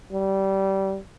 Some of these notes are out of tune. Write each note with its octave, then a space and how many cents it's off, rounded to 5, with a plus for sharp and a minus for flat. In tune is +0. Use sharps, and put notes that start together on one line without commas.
G3 -20